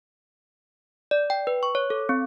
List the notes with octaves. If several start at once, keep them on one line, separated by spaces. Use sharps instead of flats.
D5
G5
B4
C#6
C#5
A4
C4